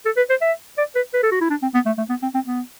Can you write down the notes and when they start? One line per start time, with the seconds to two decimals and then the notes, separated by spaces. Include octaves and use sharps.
0.05 A4
0.17 B4
0.30 C5
0.41 E5
0.78 D5
0.95 B4
1.14 B4
1.23 A4
1.32 F#4
1.41 E4
1.50 D4
1.62 C4
1.74 B3
1.86 A3
1.98 A3
2.09 B3
2.22 C4
2.34 C4
2.46 B3